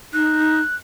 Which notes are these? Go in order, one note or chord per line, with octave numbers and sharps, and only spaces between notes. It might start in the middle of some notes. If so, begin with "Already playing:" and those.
D#4 F#6